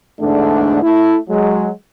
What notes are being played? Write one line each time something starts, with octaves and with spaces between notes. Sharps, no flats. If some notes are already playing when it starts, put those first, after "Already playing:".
E2 G#2 D3 A3 D4
A3 E4
F#3 G#3